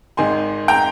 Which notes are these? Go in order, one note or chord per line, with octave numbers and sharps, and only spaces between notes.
G#1 G#2 D#3 G#3 G#5 C6
G5 A#5